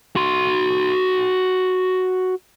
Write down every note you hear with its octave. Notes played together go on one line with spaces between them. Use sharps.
F#4 C6